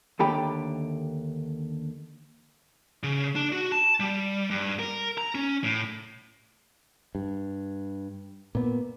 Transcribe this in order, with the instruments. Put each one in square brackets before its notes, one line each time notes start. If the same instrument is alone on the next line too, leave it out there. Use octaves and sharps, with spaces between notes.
[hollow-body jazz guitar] D#2 D3 D#3 A3 G4 B5
[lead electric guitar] C#3
D4
F#4
A5
G3
G2
A#4
A#5
C#4
A2
[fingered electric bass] G2
A#2 B3